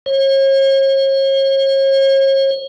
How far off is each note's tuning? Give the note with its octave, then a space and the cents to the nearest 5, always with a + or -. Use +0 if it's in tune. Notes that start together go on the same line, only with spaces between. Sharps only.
C#5 -40